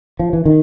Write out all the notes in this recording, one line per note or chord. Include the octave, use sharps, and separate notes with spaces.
F3
E3
D#3